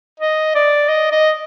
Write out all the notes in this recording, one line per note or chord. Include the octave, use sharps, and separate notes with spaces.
D#5
D5
D#5
D#5